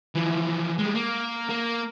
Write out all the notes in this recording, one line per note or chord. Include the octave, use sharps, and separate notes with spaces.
E3 F3
G3 G#3
A#3
A#3